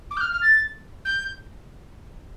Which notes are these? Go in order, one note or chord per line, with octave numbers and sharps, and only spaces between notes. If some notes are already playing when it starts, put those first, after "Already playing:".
D6
G6
F6
F6
A6
G6